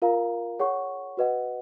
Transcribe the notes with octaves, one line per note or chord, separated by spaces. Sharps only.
F4 A#4 F5 A#5
G#4 C#5 F#5 C#6
F#4 B4 D#5 F#5